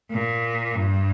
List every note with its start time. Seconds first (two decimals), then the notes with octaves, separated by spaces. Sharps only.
0.11 A#2
0.74 G2